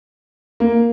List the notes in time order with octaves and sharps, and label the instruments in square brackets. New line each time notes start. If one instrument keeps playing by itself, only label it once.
[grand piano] A#3